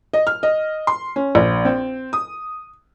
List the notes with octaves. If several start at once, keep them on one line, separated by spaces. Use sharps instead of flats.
D#5
F6
D#5
C6
C#4
A#1
C4
D#6